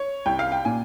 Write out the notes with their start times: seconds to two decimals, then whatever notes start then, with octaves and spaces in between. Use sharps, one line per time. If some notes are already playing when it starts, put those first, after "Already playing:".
Already playing: C#5
0.26 C2 G5
0.39 F5
0.52 G5
0.65 A#2 G#5